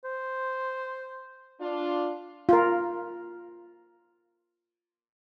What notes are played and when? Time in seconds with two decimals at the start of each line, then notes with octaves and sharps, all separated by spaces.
0.05 C5
1.61 D4 F4
2.49 F4 A#4